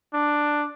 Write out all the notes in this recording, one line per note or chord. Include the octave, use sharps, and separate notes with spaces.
D4